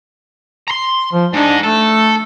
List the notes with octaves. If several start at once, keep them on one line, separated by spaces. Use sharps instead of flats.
A#5 C6
F3
G#2 D4 D#4
A3 A4